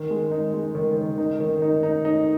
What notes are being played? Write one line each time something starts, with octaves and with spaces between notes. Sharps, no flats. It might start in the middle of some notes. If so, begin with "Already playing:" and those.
Already playing: D#3
G#3
D#4
G#3
D#3
D#3
D#4
D#3
D#4
D#4
D#4